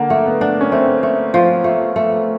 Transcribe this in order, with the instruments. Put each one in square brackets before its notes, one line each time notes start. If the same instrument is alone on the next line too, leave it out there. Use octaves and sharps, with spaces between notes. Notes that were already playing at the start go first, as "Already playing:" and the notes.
Already playing: [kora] D3 [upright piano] A#3
[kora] A3
[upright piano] B3
[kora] D4
[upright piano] C#4
[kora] A3 [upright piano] C4
[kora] A3
F3
A3
A3